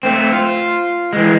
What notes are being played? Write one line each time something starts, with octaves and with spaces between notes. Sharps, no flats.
A3 C4
F4
E3 G#3